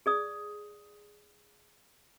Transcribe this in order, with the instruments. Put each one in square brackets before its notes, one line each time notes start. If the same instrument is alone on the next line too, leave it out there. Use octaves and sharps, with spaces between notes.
[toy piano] G#4 D5 D#6